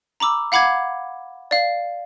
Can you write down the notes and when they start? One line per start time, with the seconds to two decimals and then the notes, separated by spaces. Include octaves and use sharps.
0.20 A#5 B5 D6 E6
0.52 F5 F#5 B5 D6 G#6
1.51 D5 F5